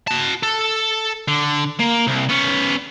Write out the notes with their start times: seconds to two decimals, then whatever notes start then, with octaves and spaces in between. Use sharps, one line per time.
0.07 F#4 A5
0.43 A4
1.28 D3
1.79 A#3
2.07 C2
2.29 B3 C#4